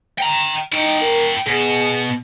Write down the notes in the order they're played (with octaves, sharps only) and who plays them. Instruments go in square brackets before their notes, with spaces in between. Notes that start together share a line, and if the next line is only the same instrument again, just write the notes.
[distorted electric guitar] G5 A#5
[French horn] D#4 [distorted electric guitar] E4 G5
[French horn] A#4
[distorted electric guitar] B2 [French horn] G#4